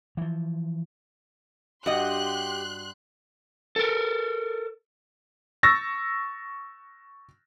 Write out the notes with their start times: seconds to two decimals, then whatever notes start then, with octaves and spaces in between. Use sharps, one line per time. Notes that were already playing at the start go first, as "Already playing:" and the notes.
0.17 E3 F3
1.86 G2 F#4 G4 D#5 C6 F#6
3.76 A4 A#4
5.63 C#6 E6 A6 A#6